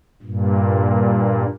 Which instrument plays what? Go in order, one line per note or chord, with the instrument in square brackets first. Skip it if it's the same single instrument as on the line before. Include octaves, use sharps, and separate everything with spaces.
[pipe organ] G2 A#2